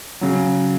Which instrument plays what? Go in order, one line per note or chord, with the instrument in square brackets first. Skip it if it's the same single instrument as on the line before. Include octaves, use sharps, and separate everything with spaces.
[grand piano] C#3 F#3